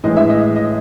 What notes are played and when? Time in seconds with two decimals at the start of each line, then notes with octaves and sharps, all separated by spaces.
0.04 A2 E3 G#3 D#5
0.17 E5
0.29 D#5
0.56 D#5